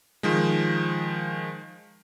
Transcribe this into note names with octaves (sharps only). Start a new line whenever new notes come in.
D#3 F3 G#3